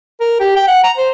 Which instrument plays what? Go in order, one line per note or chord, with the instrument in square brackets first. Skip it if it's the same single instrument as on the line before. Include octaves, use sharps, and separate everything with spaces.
[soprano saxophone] A#4
G4
G5
F#5
A#5
C5